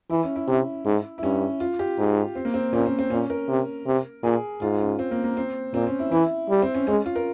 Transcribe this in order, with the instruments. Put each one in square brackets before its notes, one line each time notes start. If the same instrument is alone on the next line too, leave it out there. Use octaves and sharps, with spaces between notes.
[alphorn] E3 [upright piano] E4
[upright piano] C#4
E4
[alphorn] C3
G#2
[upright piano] E4
[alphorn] G2 [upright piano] C#4
[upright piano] F4
G4
[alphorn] G#2
[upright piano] C4
A#3
C4
[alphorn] A#2 [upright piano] C#4
[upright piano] C4
C4
[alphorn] A#2 [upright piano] C#4
[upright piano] A#4
[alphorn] C3
C3
[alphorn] A#2 [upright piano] G#4
[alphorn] G#2 [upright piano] F4
[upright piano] C#4
C4
A#3
A#3
C4
[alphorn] A#2 [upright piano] C4
[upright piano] C#4
E4
[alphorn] E3 [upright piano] E4
[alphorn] G3
[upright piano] C4
C#4
[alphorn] G#3 [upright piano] C#4
[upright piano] F4
A#4